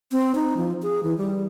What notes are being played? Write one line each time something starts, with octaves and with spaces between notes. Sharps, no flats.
C4
D#4
F3
G#4
E3
G3